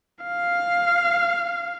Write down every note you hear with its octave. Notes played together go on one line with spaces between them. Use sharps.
F5